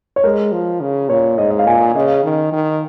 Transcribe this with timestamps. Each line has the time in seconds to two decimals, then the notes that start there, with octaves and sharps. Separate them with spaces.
0.16 C#5
0.24 G#3 A#4
0.52 F3
0.81 C#3
1.09 A#2 C#5
1.38 G#2 D#5
1.51 D#5
1.59 F5
1.66 A#2 G#5
1.96 C#3 D#5
2.24 D#3
2.52 D#3